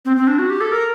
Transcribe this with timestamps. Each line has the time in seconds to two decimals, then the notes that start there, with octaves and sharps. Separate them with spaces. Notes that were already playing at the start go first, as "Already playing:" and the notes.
0.05 C4
0.17 C4
0.27 D4
0.39 F#4
0.50 G4
0.61 A4
0.72 A#4